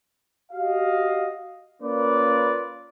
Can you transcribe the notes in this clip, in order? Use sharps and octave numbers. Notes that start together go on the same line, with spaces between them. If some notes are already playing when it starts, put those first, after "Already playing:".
F#4 G4 D#5 F5
A#3 C#4 F4 B4 D5